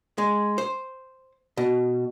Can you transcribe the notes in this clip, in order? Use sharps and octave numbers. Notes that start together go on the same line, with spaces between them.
G#3
C5
B2